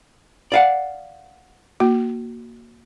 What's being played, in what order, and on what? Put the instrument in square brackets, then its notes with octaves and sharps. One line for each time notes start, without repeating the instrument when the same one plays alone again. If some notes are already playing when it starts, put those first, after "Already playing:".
[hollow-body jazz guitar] D5 F5 F#5
[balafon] A#3 F#4